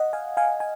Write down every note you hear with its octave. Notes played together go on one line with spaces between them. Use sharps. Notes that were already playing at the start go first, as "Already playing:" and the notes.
Already playing: D#5 F#5
F5 G#5
F5 G#5
G#5